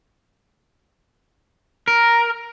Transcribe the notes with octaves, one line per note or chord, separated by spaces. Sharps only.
A#4